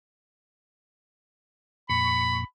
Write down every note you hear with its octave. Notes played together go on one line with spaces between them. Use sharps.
F2 A#2 B5 C#6